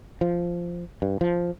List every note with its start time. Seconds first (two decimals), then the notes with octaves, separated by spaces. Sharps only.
0.21 F3
1.02 G2
1.21 F3